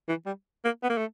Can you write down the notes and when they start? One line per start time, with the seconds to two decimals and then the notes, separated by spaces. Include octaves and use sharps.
0.08 E3
0.26 G3
0.64 A#3
0.83 B3
0.90 A#3
0.97 A3